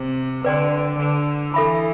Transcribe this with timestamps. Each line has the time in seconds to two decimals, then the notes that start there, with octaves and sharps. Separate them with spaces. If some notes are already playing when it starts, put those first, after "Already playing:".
Already playing: C3
0.45 D3 B4 D5 G5 C6
0.99 D3
1.54 E3 A4 E5 B5